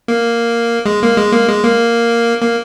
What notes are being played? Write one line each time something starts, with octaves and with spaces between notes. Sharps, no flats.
A#3
G#3
A#3
G#3
A#3
G#3
A#3
A#3